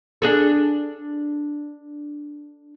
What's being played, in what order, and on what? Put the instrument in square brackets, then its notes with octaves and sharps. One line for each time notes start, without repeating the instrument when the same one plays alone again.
[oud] D4 G#4 A4